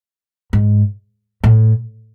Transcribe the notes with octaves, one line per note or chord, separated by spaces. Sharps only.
G#2
A2